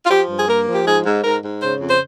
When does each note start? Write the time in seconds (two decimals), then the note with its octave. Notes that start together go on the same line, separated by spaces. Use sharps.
0.05 F4
0.10 F3 G4
0.29 G2
0.37 G#4
0.47 A#3 A#4
0.66 F3
0.74 G4
0.86 G#2 G#4
1.05 G#2
1.23 G#2 A#4
1.43 G#2
1.62 C#3 C5
1.80 F2
1.89 C5